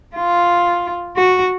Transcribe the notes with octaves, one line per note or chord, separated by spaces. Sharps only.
F4
F#4